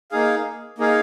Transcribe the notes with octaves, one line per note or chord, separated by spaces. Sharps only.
A#3 D#4 G#4 F5
A#3 D#4 G#4 F5